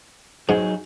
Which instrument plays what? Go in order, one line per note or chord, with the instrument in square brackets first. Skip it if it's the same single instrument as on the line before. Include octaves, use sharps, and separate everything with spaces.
[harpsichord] G#2 [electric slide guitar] F#3 D#4 G#4